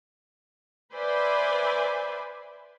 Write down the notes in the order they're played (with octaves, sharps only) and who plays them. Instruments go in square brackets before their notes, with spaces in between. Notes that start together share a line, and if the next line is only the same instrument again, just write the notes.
[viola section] B4 C5 D5 E5 G#5 B5